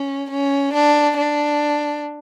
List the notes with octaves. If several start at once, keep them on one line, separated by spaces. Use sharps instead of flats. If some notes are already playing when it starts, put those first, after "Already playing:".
Already playing: C#4
C#4
D4
D4